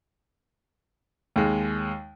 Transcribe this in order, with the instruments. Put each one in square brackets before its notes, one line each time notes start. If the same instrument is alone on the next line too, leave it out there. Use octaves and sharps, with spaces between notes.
[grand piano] D#2 G#3